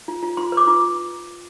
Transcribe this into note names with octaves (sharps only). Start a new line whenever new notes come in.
F4
F4
F4 C6
B4
D6
F4